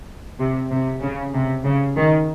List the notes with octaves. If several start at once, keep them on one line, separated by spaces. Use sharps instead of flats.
C3
C3
C#3
C3
C#3
D#3